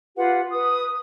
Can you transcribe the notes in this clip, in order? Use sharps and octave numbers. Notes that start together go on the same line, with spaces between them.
F4 G4 B4 F#5
B4 D#6